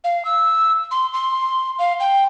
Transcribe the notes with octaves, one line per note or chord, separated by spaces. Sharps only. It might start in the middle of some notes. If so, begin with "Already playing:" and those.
F5
E6
C6
C6
F5
G5